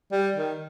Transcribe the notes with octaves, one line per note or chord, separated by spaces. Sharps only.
G3
D#3